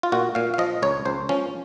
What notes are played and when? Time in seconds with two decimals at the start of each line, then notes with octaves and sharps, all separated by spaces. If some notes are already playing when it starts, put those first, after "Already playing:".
0.03 F4
0.12 A#2 F#4
0.35 A#2 F5
0.54 F5
0.58 F3 D#5
0.82 C#2 C#5
1.05 C#2 C5
1.29 F3 C#4